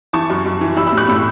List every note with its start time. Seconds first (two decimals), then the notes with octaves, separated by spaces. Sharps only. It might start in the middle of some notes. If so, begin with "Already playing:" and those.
0.13 E3 A5 C#6
0.30 F#2
0.46 F#2
0.61 E3
0.76 E3 B5 E6
0.87 B5 E6
0.92 A2
0.97 C#6 F#6
1.08 A2 B5 E6